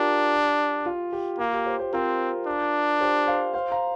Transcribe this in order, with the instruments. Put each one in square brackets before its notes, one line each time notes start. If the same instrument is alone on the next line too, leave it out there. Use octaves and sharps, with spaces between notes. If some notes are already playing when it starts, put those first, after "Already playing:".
Already playing: [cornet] D4 [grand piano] F4 G4 A#4
[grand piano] F4
G4
[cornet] A#3 [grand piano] F4
[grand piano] G4
G4 C5
G4 C5
[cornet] C4 [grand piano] F4 A#4
[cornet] D4
[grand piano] G4 C5
C5 F5
C5 F5
F5 A#5